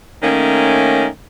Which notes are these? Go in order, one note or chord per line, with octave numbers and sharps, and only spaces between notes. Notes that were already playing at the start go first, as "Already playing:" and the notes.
D#3 A3 A#3 C#4